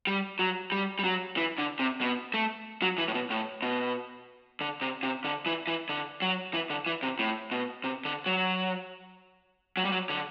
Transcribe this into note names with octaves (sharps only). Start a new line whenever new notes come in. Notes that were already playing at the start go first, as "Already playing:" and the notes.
G3
F#3
G3
G3
F#3
E3
D3
C3
B2
A3
F#3
E3
A2
B2
A2
B2
D3
C3
C3
D3
E3
E3
D3
F#3
E3
D3
E3
C3
A2
B2
C3
D3
F#3
F#3
G3
F#3
D3